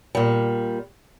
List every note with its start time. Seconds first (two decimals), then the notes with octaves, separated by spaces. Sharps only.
0.15 A#2 G3